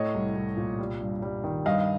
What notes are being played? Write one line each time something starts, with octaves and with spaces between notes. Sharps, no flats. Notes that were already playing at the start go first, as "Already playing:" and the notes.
Already playing: A2 A3 C#5 D#5
C2
C2
A#2
G3
G2
G3
D#3
G2 D#5 F5